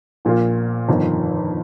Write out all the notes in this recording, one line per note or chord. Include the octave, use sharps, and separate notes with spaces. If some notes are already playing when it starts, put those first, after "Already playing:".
A#1 A#2 A#3 F4
G1 F2 D#3